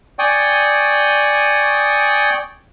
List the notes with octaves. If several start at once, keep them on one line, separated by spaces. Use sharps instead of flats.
D5 G5 G#5 C#6 D#6